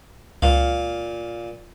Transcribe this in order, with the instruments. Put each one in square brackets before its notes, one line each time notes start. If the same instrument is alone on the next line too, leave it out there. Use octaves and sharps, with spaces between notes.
[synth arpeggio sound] C#2 [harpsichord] A#2 F5